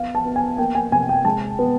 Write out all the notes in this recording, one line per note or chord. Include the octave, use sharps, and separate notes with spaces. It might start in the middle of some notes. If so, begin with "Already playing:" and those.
Already playing: B3 F5
A5
B3
G#5
A#3 G5
G#5
C3 G#5
G5
G#3 A5
B3